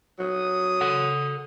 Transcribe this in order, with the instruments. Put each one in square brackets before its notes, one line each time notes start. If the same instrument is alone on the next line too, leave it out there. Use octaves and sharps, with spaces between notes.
[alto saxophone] F#3 [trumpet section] D#6
[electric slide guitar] A4 F#5